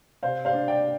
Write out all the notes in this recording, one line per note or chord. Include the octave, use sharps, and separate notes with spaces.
C3 C5 F5
C5 F5
D4
D5 G5